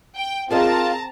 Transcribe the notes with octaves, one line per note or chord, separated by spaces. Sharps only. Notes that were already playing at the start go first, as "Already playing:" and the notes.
G5
C4 F4 G#4 A#4 D#5 A5 A#5